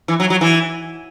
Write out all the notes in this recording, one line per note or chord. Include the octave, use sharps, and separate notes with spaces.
E3
F#3
F#3
E3